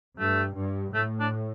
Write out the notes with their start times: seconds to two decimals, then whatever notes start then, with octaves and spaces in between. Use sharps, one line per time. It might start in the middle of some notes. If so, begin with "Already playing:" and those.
0.19 G2 A3
0.57 G2
0.94 A2 A3
1.20 D4